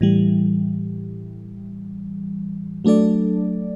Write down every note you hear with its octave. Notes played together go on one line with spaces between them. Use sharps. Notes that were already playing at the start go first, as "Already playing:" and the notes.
A2 E3 G3
F#3 A3 D4 A4 D5